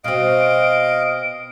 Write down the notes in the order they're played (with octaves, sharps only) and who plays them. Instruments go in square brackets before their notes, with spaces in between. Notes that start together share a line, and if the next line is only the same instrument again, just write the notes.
[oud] B2 C4 [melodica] D#5 F5 [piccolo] D7